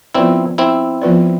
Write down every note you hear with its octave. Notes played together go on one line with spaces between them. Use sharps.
F3 B3 C4 E4 F4 B4 D5
C4 E4
F3 B3 F4 B4 D5